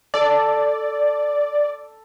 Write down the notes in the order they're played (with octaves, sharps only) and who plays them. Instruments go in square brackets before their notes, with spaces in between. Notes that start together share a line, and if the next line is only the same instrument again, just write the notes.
[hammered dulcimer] A4 [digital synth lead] D5